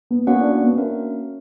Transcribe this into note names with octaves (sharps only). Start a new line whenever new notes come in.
B3
A#3 B3 C#4 F#4 C#5 F#5
D4
D4
B3
A#3 C#4 D4 F#4 A#4 E5